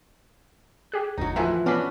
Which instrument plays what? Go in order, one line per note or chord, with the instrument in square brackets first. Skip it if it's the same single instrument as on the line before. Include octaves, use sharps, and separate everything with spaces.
[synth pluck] G4 G#4 F#6
[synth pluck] G1 E2 [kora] F#3 D#4
[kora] A2 E3 F3 [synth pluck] E5 F#5 G#5
[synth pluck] B3 D5 B5 [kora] C#4 D4 F#4